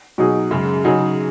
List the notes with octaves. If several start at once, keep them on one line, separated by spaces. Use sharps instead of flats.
B2 F#3 D#4 G#4
F#2 C#3 G#3
C#3 F#3 D#4 G#4